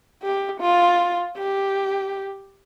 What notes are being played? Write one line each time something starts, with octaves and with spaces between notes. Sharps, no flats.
G4
F4
G4